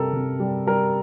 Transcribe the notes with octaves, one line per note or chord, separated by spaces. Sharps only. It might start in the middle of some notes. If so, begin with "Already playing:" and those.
Already playing: C3 G3 A4 A#4
C3
G3
G3 A#4